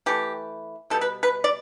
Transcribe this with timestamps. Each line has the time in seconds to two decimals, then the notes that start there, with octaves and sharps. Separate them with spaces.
0.06 E3 A3 G4
0.90 B2 G3 B3 A4
1.01 B4
1.23 B4
1.44 D5